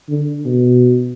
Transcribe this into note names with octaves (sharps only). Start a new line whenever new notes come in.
D3
B2